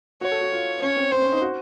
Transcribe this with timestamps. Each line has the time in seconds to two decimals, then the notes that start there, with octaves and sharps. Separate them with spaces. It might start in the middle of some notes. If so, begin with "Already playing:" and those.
0.21 F#4 C#5
0.32 A4
0.41 F#4
0.52 F4
0.82 C#4 C#5
0.97 C4
1.11 C4 C5
1.22 C#4
1.32 D#4
1.41 F#4